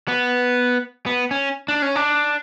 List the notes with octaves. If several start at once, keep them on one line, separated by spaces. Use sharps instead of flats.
B3
B3
C#4
D4
C#4
D4